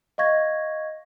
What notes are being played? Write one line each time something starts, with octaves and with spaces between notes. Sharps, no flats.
D#5 F5 C#6 G#6 A#6